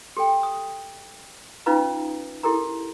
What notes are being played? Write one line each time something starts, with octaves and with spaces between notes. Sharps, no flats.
G4 A4 G5
D#6
C#4 D#4 F4 B4 F5 A#5
E4 G4 A4 A#4 A#5